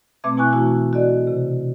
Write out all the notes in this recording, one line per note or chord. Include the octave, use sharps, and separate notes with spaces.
B2 A3 C4 E5 D6 G#6
B2 E4 G#5 C#6 F#6
B2 E3 A3 E4 F#4
F#4 A4 D5 D#5
C3